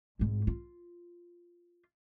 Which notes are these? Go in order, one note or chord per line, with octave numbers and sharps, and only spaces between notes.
G#1 G#2
F4